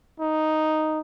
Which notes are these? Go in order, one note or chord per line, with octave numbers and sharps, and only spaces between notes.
D#4